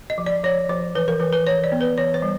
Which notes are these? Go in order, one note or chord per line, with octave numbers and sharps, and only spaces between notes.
D#5
F3
D5
F3 C#5
F3 C5
E3 B4
A#4
E3 B4
B4
E3 C#5
D5
B3
B4
E3 C#5
C5
G3